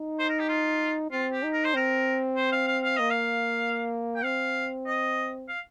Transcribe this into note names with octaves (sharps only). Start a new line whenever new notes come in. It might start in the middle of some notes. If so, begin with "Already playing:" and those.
Already playing: D#4
C5
A#4
G4
F4
C4 F4
G4
D#4
A#4
C5
C4 A#4
C5
F5
F5
F5
A#3 D#5
F5
G5
C4 F5
D#5
F5